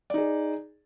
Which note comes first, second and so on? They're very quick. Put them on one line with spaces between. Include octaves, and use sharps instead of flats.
D5 D#4 G#4